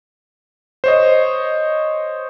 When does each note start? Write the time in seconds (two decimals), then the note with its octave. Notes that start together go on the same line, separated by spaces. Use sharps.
0.84 C5 C#5 D#5